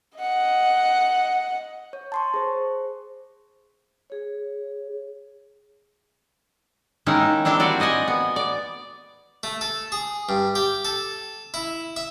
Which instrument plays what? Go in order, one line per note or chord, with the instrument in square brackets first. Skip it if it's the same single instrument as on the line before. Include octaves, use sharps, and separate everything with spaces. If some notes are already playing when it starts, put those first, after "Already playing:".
[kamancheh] D#5 F#5
[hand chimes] C#5
A5 C6 C#6
G#4 C5
[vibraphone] G#4 C#5
[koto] D#3 G#3 A#3 C#4 D#4 E4
C4 D4 E4 G4
G3 F#4 D5
D5 D#5 F#5 G#5
B3
D5
[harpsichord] A3
A4
G#4
G2
G4
A4
E4
E5